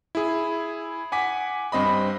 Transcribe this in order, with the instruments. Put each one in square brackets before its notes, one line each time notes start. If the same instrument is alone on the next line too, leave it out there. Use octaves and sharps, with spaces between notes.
[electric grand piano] E4 G#4
F#5 G#5 D6 B6
G2 C4 D#5 B5